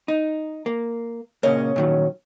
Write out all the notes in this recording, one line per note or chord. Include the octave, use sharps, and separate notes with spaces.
D#4
A#3
A#2 C#3 A#3 C#4 D#5
A#2 D#3 F#3